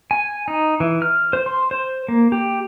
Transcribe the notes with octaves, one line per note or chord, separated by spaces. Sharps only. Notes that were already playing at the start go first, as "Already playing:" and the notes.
G#5
D#4
E3
F6
C5
C6
C5
A#3
G4